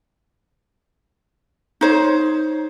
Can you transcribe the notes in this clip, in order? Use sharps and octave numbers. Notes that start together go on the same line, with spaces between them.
D#4 C5 C#5